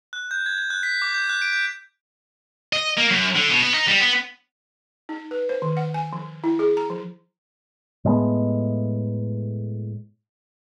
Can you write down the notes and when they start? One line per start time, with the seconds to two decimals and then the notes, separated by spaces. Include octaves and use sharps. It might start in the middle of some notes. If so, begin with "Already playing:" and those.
0.13 F#6
0.31 G6
0.46 G#6
0.58 G#6
0.70 F#6
0.83 B6
1.02 D6
1.15 G6
1.29 F#6
1.42 D7
1.53 G6
2.73 D#5
2.98 A#3
3.11 F#2
3.36 D3
3.50 B2
3.63 B3
3.74 D#4
3.88 G3
4.01 B3
5.09 D#4
5.31 B4
5.49 C5
5.62 D#3
5.77 F#5
5.94 G#5
6.13 F3
6.44 E4
6.59 G#4
6.77 A#5
6.90 F3
8.05 A2 G#3 A3 B3